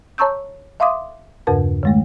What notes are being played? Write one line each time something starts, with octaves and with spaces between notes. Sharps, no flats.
C#5 A5 A#5 C#6 E6 G6
E5 F5 C6 D6 D#6
E2 G2 C#3 A#4 B4 A5
D#3 G#3 A3